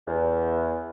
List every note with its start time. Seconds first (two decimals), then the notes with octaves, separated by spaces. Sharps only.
0.08 E2